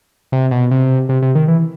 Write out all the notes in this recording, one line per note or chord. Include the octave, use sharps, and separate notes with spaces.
C3
B2
C3
C3
C3
D#3
E3